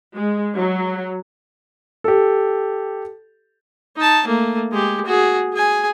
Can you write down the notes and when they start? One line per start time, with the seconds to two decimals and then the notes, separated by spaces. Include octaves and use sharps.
0.18 G#3
0.55 F#3
2.04 G4 A4
3.96 D#4 A5
4.26 A3 A#3
4.72 G#3 G4
5.06 F#4 G#4
5.53 G#4 G#5